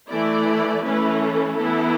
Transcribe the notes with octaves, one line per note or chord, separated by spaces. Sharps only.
E3 A3 E4 D5
E3 A3 C#4 E4 B4
A4
E3 B3 E4